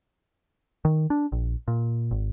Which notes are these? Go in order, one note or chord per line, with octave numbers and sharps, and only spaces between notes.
D#3
D4
A#1
A#2
G#1